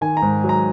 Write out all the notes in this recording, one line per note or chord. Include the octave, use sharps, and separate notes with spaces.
D#3 G#5
A#5
G#2
F#3
A#5